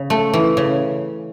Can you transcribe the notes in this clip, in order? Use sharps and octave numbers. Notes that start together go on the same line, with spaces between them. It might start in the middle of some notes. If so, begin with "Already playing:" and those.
Already playing: C#3
A3
E3
C#3